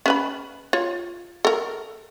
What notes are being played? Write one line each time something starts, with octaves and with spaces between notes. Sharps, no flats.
C#4 B4 B5
F4 C#5
A4 A#4